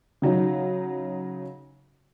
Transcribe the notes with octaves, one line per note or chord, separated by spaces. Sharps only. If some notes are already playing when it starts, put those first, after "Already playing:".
C#3 F#3 D#4